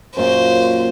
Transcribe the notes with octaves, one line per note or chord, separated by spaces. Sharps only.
F#2 A#2 C5